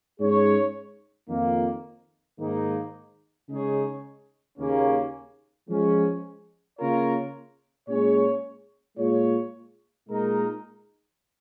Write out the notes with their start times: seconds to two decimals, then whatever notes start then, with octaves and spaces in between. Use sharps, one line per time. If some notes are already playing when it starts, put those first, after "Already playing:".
0.20 G#2 G#3 C#4 G#4 C#5
1.29 F2 D#3 A#3
2.39 G#2 D#3 A#3 D#4
3.49 C#3 G#3 D#4 G#4 C#5
4.59 D#2 C#3 A#3 C#4
5.69 F3 G#3 C#4
6.78 C#3 A#3 F4 A#4 C#5
7.88 A#2 G#3 C#4 G#4 C#5
8.98 A#2 G#3 F4 G#4 C#5
10.08 A#2 G#3 D#4 A#4